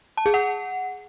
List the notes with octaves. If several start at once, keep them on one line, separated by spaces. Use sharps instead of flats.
A5
G#4
F#5